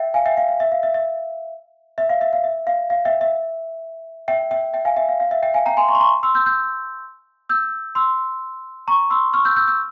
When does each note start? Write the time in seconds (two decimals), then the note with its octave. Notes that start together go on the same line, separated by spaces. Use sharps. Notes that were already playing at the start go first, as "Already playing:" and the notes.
Already playing: E5 G5
0.14 F5 G#5
0.26 E5 G5
0.37 F5
0.48 F5
0.60 E5
0.72 F5
0.83 E5
0.94 E5
1.98 E5
2.09 F5
2.21 E5
2.33 F5
2.44 E5
2.67 F5
2.90 F5
3.05 E5 G5
3.21 E5
4.28 E5 G5
4.51 E5 G5
4.74 E5 G5
4.85 F5 G#5
4.96 E5 G5
5.09 F5
5.20 F5
5.31 E5 G5
5.43 E5 G5
5.54 F5 G#5
5.66 G5 A#5
5.77 G#5 C6
5.88 A#5 C#6
5.95 C6
6.00 A#5 C#6
6.23 C6 E6
6.35 E6 G6
6.46 E6 G6
7.49 E6 G6
7.95 C6 E6
8.88 A#5 C#6
9.10 C6 E6
9.33 C#6 F6
9.45 E6 G6
9.56 E6 G6
9.68 E6 G6